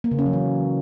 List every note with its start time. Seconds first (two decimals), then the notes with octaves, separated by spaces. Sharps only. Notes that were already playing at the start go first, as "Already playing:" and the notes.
0.04 A#3
0.11 C#3
0.19 C#4
0.26 F#3
0.33 E3